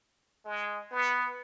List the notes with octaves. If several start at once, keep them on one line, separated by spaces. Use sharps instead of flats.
G#3
B3